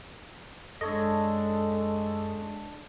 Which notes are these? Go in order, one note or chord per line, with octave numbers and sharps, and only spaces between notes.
F#2 G#3 D4 A4 C#5 D#5